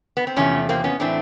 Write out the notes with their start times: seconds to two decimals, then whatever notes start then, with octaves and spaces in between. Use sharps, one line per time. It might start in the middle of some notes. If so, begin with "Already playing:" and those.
0.17 B3
0.27 C4
0.36 E2 C3 F3 A3 C#4
0.69 A#3 C4
0.84 B3 C#4
1.00 A2 E3 A3 C4 D4